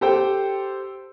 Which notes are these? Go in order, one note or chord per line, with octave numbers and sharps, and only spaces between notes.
G4 A4 C5 G5